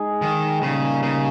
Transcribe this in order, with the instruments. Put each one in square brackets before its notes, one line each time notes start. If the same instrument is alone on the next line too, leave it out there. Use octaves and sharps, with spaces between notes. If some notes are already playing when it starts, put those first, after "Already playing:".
Already playing: [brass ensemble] G#3 D#4 G#4
[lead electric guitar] D#3
[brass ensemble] A#2 G3 A#3 D#4 G4 [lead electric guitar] C#3
[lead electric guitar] C#3